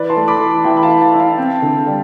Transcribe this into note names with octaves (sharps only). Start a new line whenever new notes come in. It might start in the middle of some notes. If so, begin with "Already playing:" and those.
Already playing: E3 B4 D5
A5 C6
A3
B5 D6
E3
E3 E5 G5
B5
F5 A5
E3
F5 A5
E4
F5 A5
C4
D3
G3